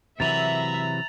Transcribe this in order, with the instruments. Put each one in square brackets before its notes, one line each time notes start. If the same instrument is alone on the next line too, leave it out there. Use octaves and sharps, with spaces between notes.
[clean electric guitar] C3 E3 F#3 [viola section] E5 [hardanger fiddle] A#5 [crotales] A6 F7 F#7